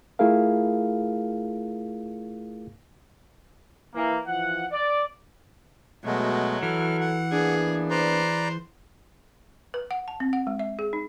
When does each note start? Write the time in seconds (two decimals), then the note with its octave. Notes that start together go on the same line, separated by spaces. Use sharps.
0.19 A3 E4 F4 G#4 A#4 F5
3.94 E3 A#3
4.27 E3 F3 F#5
4.72 D5
6.05 B2 F#3 G#3 A3
6.63 E3 A4 F6
7.01 F#5
7.32 A#3 B3 D4 G#4
7.90 B4 C5 D5 A#5
9.74 B4
9.91 F#5
10.08 A5
10.20 C4
10.33 F#5
10.47 G#3
10.59 E5
10.79 G#4
10.93 D#4